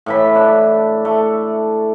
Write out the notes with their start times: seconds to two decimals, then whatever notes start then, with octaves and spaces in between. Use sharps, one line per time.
0.06 A2 E3 B5
0.35 D4
1.05 A3